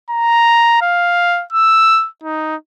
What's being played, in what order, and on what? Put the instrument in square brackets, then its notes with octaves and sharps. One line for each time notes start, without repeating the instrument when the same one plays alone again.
[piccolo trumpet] A#5
F5
E6
D#4